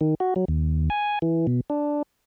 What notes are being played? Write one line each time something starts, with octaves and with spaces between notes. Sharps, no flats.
D#3
F#4
F#3
D#2
G#5
E3
B2
D4